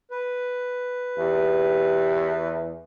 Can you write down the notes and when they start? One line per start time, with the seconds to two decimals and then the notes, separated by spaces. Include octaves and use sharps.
0.11 B4
1.18 E2 G4